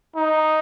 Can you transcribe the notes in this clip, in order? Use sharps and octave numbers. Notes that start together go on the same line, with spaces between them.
D#4